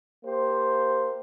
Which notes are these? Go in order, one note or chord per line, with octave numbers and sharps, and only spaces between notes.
A#3 G4 C5